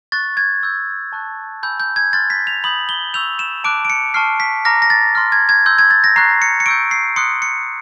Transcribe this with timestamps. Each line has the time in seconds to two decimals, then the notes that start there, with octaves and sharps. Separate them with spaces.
0.12 C#6 F#6 A6
0.37 G#6
0.63 C#6 E6 G6
1.12 A5 C#6 F#6
1.63 G#5 B5 E6 G6
1.80 G6
1.96 G#6
2.13 C6 F6 A6
2.30 B6
2.47 F7
2.64 B5 D#6 G6 F#7
2.89 G7
3.14 C#6 E6 G6 F7
3.39 E7
3.64 A5 D6 F#6 D7
3.85 D7
3.90 C#7
4.14 A5 C#6 F6 C7
4.40 B6
4.65 A#5 D6 F6 A#6
4.82 A#6
4.90 A6
5.15 C6 F6
5.32 G#6
5.49 G#6
5.66 C6 E6 G6
5.79 G#6
5.91 A6
6.04 A#6
6.16 A#5 C#6 F#6 C7
6.42 C#7
6.60 C#7
6.66 C#6 E6 G6 D7
6.91 C7
7.16 C6 D#6 F#6 C#7
7.42 C#7